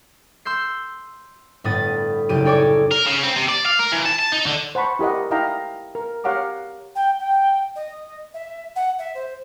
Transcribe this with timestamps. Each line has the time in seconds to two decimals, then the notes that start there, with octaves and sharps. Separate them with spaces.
0.45 C6 E6 G6 C7
1.64 G1 A2 B3 D#6 A6
2.29 F#1 G4 D#7
2.45 D#4 A4 C#5 D5 G#5 D6
2.91 A#4
3.06 C#3
3.23 C4
3.36 C3
3.48 D5
3.65 F5
3.79 A#4
3.92 E3
4.05 A5
4.19 A5
4.32 D#4
4.46 D3
4.75 C5 F#5 A5 B5 C#6
4.99 E4 G4 A#4 D#5 F#5
5.31 D#4 E4 D#5 F5 G5 A#5
5.95 A#4
6.24 G4 C#5 F5 F#5 A#5 D6
6.95 G5
7.19 G5
7.76 D#5
8.34 E5
8.76 F#5
8.99 E5
9.15 C5